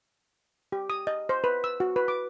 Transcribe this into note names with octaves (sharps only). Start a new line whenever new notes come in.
G4
D#6
D#5
C5
B4
E6
F#4
B4
D6